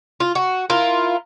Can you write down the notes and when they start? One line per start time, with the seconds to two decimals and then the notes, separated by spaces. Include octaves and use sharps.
0.20 F4
0.35 F#4
0.70 E4 F4 A#4